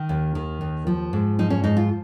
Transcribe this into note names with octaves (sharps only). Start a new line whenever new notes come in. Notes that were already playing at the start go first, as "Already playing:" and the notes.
Already playing: D#3
D#2
D#3
D#2
F3
G#2
F3 D#4
C#4
G#2 D#4
F4